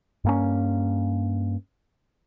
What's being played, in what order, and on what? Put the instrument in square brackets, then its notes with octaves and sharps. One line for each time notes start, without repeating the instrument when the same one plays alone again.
[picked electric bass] G2 A#3 C#4